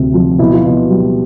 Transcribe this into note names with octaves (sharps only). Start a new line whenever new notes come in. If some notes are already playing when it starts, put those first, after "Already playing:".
Already playing: D2 C3 C4
F3
B2 E4
F4
B2 E4
G3